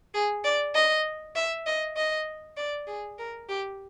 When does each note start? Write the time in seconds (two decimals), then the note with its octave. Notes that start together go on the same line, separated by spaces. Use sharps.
0.14 G#4
0.44 D5
0.75 D#5
1.36 E5
1.66 D#5
1.97 D#5
2.57 D5
2.87 G#4
3.18 A#4
3.49 G4